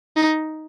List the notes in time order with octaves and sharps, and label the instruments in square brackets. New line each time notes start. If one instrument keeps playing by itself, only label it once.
[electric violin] D#4